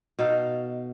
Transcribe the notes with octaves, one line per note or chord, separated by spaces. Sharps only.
B2 D#4 A4 F5